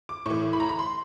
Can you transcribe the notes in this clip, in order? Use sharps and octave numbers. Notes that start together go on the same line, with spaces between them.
D6
A2 E3 C#6
B5
A#5
B5
C6